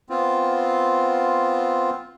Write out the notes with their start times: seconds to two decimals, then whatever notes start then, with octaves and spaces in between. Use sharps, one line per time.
0.10 B3 C4 F4